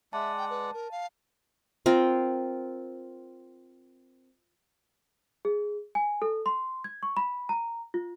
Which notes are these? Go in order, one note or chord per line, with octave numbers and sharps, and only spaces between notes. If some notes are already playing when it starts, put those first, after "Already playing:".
G#3 D5 E5 F#5 A5
G5
B4
A#4
F5
C4 F4 A#4
G#4
G#5
A4
C6
G#6
C#6
B5
A#5
F4